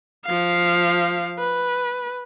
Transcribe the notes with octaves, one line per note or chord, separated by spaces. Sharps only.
F3 F5
B4